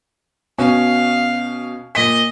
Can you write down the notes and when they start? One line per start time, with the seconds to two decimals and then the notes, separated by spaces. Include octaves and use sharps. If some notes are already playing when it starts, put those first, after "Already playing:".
0.58 B2 C#4 F5
1.95 A#2 D#5 B6